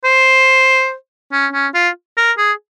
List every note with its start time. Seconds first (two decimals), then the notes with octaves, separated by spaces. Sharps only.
0.05 C5
1.32 C#4
1.53 C#4
1.74 F4
2.17 A#4
2.37 G#4